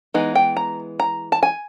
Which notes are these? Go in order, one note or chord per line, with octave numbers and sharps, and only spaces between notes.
E3 G#3 B3 D#4
G5
A#5
A#5
A5
G#5